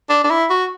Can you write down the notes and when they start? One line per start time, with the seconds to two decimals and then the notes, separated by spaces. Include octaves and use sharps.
0.09 D4
0.24 D4
0.30 E4
0.50 F#4